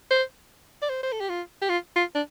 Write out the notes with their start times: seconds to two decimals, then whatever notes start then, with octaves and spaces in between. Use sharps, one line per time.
0.10 C5
0.82 D5
0.89 C5
1.03 C5
1.12 A4
1.20 G4
1.29 F4
1.62 G4
1.69 F4
1.96 F4
2.15 D4